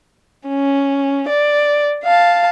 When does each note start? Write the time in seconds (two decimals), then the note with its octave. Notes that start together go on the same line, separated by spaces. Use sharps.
0.48 C#4
1.29 D5
2.04 F5 A5